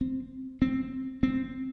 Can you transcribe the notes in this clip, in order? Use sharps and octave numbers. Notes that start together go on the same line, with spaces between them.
C4
C4
C4